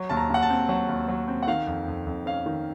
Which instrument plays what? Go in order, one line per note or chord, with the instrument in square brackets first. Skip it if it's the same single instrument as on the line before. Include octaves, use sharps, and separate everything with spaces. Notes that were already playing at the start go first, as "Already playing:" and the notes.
Already playing: [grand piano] F#3
D#2 A5
A#5
D#2 F#5
A5
C4
F#3 F#5
D#2
F#3
C4
F#5
D#3 F5
F2
F2
F2
C#4 F5
D#3